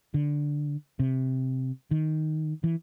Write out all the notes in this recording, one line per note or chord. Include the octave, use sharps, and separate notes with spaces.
D3
C3
D#3
E3